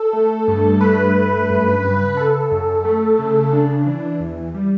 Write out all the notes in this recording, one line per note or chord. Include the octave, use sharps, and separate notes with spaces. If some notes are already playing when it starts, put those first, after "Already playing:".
Already playing: A4
A3
G2
A3 B4
G2
F#2
C#3
C#3 A4
F#2
A3
C#3
D4
E3
E2
G3